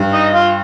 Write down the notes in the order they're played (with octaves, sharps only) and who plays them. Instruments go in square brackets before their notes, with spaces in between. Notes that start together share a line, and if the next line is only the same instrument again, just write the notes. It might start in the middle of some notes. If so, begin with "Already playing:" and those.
Already playing: [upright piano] G2
[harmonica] D#4 D#5
F4 F5